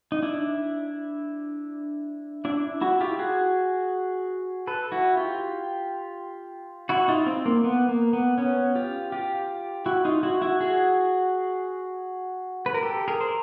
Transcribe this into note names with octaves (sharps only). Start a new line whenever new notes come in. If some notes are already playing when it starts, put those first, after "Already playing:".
D#4
D4 E4
D4 E4
E4 F#4
F4 G4
F#4 G#4
A4 B4
E4 F#4
F4 G4
E4 F#4
D#4 F4
C4
A#3
B3
A#3
B3
B3 C#4
F4 G4
F4 G4
E4 F#4
D#4 F4
E4 F#4
E4 F#4
F#4 G#4
B4
A#4
G4 A4
G#4 A#4
C5